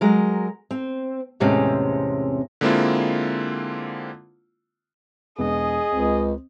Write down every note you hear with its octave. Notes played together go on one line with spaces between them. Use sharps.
F#3 G#3 A#4
C4
E2 A2 C3 G#3 C4 C#4
D3 G#3 A#3 C4 E4 F4
E1 B3 G#4 D#5
C#2 C4